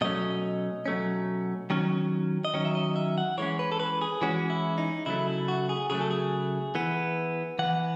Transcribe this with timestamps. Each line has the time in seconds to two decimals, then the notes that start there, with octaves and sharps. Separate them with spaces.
0.01 B2 F#3 A3 C#4 D#5
0.86 B2 F#3 A3 C#4
1.70 D#3 F#3 C#4
2.45 D#5
2.54 D#3 F#3 C#4 C#5
2.65 E5
2.75 D#5
2.96 E5
3.18 F#5
3.38 E3 G#3 C#4 C#5
3.59 B4
3.72 A4
3.80 B4
4.02 G#4
4.22 E3 G#3 C#4 F#4
4.50 E4
4.78 D#4
5.06 C#3 F#3 A3 E4
5.28 E4
5.48 F#4
5.69 G#4
5.90 C#3 F#3 A3 G#4
6.01 A4
6.11 G#4
6.75 E3 B3
7.59 E3 B3 F#5